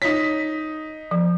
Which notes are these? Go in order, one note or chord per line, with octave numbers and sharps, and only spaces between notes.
D#4 C#5 B6
F3